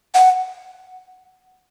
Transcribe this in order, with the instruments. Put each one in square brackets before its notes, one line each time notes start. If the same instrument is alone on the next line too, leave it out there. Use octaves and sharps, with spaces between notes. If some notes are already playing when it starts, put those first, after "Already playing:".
[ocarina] F#5